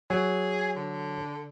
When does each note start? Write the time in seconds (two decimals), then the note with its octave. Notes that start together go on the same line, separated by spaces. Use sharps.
0.10 F#3 G#4
0.76 D3